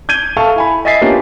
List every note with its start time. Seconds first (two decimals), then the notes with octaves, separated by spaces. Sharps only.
0.09 G6 G#6 D#7 G7
0.37 A4 E5 F5 A5 C#6
0.56 E4 G#5 B5
0.85 D#5 E5 G#5 A6 B6 C7
1.01 A#3 B3 C#4 D4 F4 G4